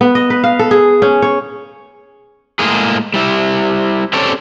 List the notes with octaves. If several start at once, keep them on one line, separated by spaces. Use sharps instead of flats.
B3
D#5
B4
F5
A4
G#4
C#4
C#5
A2 G#3 A#3 G#4
G3 E4
C4 C#4 G4 A4 C#5 D5